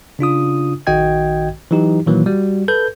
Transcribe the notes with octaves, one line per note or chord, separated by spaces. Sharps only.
C#3 D4 F4 D#6
A#1 D#3 F#4 D#5 G5 G#6
E3 F#3 D#4 G4
A#2 D#3 E3 F#3 A#3
G3 F#4
A4 B4 G6